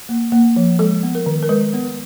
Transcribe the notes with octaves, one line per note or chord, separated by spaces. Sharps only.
A#3
A#3
F3
G#3 A4
B3
A#4
D#3
A#4
G#3 B4
B3